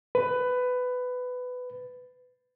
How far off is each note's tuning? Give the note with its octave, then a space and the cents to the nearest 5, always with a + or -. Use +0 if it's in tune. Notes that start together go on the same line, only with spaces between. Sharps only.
B4 +15